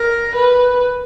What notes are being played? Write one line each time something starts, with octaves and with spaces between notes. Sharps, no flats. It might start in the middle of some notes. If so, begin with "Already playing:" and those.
Already playing: A#4
B4